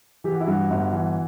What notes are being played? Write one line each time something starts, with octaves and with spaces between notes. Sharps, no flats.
E3 G4
F#4
E4
G2 F#4
G1
E3